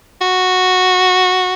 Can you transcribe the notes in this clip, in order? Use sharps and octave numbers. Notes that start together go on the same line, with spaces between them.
F#4